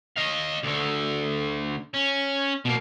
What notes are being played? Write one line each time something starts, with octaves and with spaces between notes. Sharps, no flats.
D#5 F5
D2 D3
C#4
B2 A#3